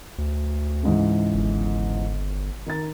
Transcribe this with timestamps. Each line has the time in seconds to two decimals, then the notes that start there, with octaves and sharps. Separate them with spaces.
0.18 D2
0.83 C#2 G#2 E3
1.34 G1
2.66 D#3 A#5 A6